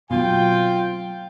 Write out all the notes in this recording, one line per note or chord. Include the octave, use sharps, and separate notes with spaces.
B2 F#3 A3 C4 F4 G5